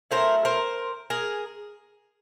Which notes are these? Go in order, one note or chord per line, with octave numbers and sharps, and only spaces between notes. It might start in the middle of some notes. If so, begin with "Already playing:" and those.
F#3 A3 C#4 E4 A#4 C5
A#4 C5
G#4 A#4